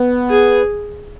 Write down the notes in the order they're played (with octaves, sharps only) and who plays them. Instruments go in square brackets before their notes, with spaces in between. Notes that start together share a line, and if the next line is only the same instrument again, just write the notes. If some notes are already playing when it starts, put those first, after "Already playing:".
Already playing: [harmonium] B3
[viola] G#4